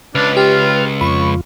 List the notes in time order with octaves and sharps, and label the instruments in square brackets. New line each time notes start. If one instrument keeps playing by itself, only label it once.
[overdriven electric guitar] C#2 [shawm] D4 [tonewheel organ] B4 F6
[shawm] F4 [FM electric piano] G4
[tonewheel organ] F2 F4 [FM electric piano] B5 [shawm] C#6